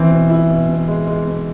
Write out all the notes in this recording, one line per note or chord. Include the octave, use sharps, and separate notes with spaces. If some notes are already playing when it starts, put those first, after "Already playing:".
Already playing: E3 C4
B2
E4
B2
B2
G#3
G#3
B2